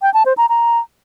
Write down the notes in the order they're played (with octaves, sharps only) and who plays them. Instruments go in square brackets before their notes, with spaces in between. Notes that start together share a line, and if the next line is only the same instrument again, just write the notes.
[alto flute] G5
A5
C5
A#5
A#5